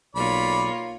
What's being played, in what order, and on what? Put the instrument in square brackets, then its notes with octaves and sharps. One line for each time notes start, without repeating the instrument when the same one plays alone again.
[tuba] B1 [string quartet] A#3 F4 C#5 [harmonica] D5 B5